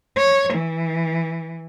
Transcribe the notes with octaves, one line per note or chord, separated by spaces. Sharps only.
C#5
E3